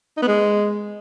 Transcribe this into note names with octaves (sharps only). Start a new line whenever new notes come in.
D#4
B3
G#3